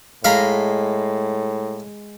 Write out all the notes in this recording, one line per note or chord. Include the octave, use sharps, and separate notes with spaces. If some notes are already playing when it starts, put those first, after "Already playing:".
A2 G#3 F5 A#5 B5